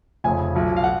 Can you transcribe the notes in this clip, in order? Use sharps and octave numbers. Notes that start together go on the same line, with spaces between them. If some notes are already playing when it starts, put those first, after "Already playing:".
F1 F2 C#3 G#5
B1 A#2
F5
F#5